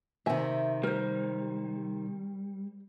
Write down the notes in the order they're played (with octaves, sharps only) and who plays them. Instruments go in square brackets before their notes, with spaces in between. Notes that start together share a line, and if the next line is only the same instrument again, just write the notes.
[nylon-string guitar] C3 D#3 [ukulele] E5 G#5
[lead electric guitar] G3 [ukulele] A#4 C5